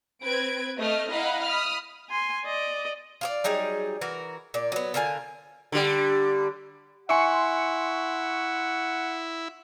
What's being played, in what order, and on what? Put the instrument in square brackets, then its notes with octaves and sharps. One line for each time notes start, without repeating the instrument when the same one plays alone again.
[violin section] C4 B4 G#6 D7
A3 D#5 F6
E4 D#5 F5 F#5 A#5 B5
B5 D#6 F6
[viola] G#5 C6
D5 D#5
[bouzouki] F4 F#4 D5
F#3 G3 D#4 G#4
E3 F#4 A#4
A#2 D5
F#3 B3
D3 F4 A#4 G#5
[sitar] D3 G3
[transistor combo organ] E4 [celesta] E5 G#5 [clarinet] F#5 [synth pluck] C6 C#6 C#7